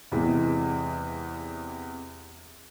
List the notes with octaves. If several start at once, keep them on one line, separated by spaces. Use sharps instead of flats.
E2 C3 E3 G#3